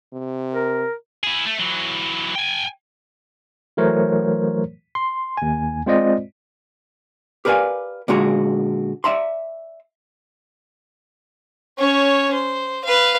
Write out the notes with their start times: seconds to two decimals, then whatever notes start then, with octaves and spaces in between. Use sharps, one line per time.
0.13 C3
0.54 A#4
1.24 E4 G#4
1.46 A3
1.60 E3 F#3
2.35 G5 G#5
3.77 E3 F#3 A3 A#4 C5 C#5
4.95 C6
5.37 D#2 G#5
5.86 G#3 C4 F4 C5 D5 D#5
7.45 G4 A#4 B4 D5 F5 G#5
8.08 A#2 D3 G#3 F#4 A#5
9.04 D5 E5 A#5 C6
11.78 C#4 C#5
12.33 C5
12.84 B4 F5